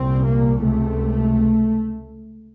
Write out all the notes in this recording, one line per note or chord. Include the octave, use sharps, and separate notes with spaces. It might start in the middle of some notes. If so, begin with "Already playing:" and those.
Already playing: C2 A#2 C4
A#3
C#2 C3 A3